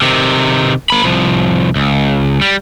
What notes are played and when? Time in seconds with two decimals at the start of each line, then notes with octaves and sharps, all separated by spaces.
0.02 C3 D#3
0.90 A#3 B5
1.04 C2 F3
1.76 C#2
2.41 G3